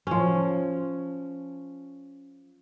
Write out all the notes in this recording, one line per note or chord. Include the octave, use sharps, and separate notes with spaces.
F3 C#4